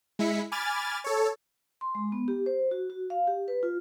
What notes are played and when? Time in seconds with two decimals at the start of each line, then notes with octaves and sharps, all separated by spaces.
0.19 G#3 E4 B6 C#7
0.52 G#5 B5 D6 F6 G#6 A6
1.04 A4 C#5
1.81 C6
1.95 G#3
2.12 B3
2.28 G4
2.46 C5
2.71 F#4
2.90 F#4
3.10 F5
3.28 G4
3.48 B4
3.63 F4